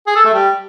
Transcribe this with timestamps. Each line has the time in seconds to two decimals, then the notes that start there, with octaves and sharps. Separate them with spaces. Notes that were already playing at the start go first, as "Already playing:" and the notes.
0.07 G#4
0.16 A4
0.25 A3
0.34 G3